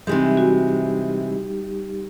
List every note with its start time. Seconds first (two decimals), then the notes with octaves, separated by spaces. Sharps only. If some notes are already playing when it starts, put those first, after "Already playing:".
0.07 C3 E3 G3 G#3 D#4 G4
0.37 F#4